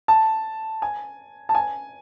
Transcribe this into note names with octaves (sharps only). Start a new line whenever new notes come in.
A5
G#5
A5
G#5